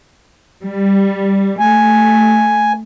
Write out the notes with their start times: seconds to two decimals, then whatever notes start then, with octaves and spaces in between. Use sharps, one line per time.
0.63 G3
1.59 A3 G#5